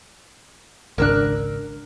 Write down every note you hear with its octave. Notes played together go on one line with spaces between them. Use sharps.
G#1 C#2 D4 A#4 E6 F#6